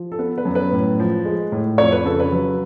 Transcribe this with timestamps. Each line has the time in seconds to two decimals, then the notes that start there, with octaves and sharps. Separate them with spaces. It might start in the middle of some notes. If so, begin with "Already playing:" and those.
Already playing: F3
0.12 A4
0.19 B3 B4
0.38 B4
0.45 F#2
0.55 B4
0.73 A2
1.00 F3
1.25 G#3
1.52 A2
1.78 F2 C#5
1.92 B4
2.05 C#3 A4
2.20 B4
2.32 F#3